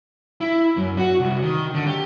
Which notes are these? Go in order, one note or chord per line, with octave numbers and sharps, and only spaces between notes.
E4
F#2
F#4
C2
D#3
D3
G4